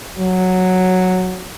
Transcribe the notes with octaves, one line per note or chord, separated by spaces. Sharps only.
F#3